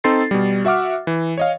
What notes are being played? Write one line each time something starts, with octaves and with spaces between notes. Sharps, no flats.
C4 D#4 A4 C6 A6 C7
B2 G3
F#4 E5 F#5 D6 F6
E3
C#5 D#5 F5